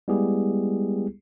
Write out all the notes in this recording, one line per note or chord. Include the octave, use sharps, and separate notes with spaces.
G3 G#3 B3 E4 G4 G#4